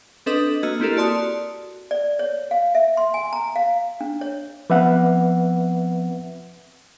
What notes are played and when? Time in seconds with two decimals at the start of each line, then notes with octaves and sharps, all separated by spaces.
0.26 C4 D4 A4 B4 D#5 D#6
0.63 A#3 F#4 D#5 E6 G#6
0.80 A#3 C4 E4 G4 A4 A#4
0.97 F#4 D5 A5 C6 D#6
1.91 D5
2.19 C#5
2.51 F5
2.75 E5
2.97 C6
3.14 G#5
3.33 A#5
3.56 F5
4.01 D4
4.21 C#5
4.70 F3 B3 C4 B4 E5 F#5